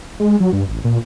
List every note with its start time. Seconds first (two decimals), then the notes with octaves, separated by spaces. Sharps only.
0.20 G#3
0.40 F#3
0.53 G2
0.68 A1
0.84 A#2